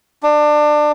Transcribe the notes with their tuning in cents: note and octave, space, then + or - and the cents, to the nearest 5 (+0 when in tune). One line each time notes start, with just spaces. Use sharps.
D4 +25